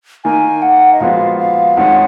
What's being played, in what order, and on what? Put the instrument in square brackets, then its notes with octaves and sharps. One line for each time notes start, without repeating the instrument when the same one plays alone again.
[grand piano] D#3 A#3 D#4 A#4 [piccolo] G#5
[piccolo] F#5
D#5
[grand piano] A#2 F3 G#3 B3 F#4 [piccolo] F5
[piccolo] F5
[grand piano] F2 D#3 G#3 C#4 [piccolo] F#5